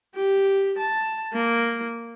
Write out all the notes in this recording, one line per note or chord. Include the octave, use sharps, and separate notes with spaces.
G4
A5
A#3